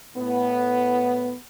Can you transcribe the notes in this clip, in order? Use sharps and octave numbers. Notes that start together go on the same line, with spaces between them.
A2 B3